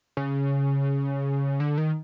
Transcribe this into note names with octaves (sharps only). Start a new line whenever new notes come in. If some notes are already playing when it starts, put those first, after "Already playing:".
C#3
D3
D#3